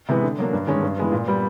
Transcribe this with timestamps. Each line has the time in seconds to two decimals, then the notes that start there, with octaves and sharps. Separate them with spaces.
0.09 C3 E3 G#3 B3
0.24 D3
0.39 F#3 A#3 D4
0.53 G2
0.67 D#3 G#3 C#4
0.83 G2
0.97 E3 G#3 B3
1.12 A#2
1.27 G3 B3